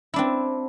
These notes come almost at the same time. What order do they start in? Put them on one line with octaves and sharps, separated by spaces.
E4 D4 C4